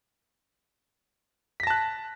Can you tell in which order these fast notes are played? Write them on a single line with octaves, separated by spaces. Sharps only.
B6 A#6 A5 F#6